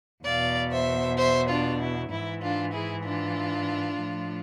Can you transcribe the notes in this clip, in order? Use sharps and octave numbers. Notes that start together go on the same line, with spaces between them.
E2 B2 D5 F5
C5 E5
C5 E5
D4 F4
E4
G#2 E3 E4
D4 F4
E4 G#4
D4 F4
A2 F3